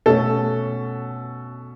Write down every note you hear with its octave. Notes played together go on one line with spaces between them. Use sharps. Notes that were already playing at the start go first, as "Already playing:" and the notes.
B2 A3 C#4 A4